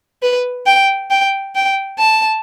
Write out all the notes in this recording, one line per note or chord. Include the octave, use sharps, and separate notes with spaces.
B4
G5
G5
G5
A5